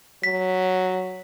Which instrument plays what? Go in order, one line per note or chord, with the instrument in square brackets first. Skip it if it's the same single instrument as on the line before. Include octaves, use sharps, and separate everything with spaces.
[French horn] F#3 [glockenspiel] B6